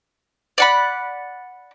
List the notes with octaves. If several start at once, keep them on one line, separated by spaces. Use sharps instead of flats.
D5 F#5 B5